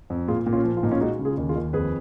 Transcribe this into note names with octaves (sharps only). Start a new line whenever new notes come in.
F2
A#2 F4 G#4
A#2
C#4 F4
F3
F4
A#2 D#4
C#4 F4
G#3 D#4 F#4
C#3
F4 G#4
D#2
F4 G#4
D#2
F2 G#4 B4